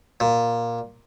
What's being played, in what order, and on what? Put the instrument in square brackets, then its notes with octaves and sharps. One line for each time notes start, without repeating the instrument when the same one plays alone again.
[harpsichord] A#2